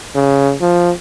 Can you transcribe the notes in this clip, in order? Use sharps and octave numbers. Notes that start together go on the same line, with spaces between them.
C#3
F3